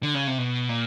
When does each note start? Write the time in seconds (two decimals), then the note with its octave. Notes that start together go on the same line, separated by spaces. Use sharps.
0.03 D3
0.14 C#3
0.27 C3
0.38 B2
0.69 A#2